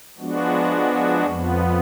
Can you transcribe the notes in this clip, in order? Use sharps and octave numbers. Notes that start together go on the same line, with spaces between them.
F3 G#3 B3 D4 F#4
F2 F3 B3